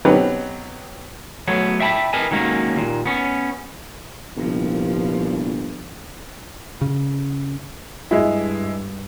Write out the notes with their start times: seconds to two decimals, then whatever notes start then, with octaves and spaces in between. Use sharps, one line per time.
0.05 B2 F#3 B3 C4 G4 B4
1.48 F#3 A3 B3 C#5
1.80 E5 G5 A5 B5
2.13 A#4 B4 D#5 G#5 A5
2.31 D#3 F#3 G#3 A#3 C#4
2.76 D#2 A#2
3.06 B3 C#4
4.37 G1 C2 G2 A#2 F3
6.81 C#3
8.11 G2 G#3 E4